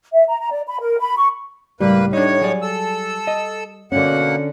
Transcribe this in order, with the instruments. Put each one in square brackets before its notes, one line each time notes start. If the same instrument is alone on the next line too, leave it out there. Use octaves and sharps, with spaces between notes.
[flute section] E5
A#5
A#5
D5
B5
A#4
B5
C#6
[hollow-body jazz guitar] C#2 A2 [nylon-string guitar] G3 [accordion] A#3 B4
[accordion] A2 C#5 [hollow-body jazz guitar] D4 D#4
[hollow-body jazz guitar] F#3 G#4 D5
[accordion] A4 E6
[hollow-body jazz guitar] D#5
[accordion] B2 A#3 F#5 [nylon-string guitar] D3 C#4